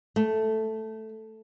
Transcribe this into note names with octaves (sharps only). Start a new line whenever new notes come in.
A3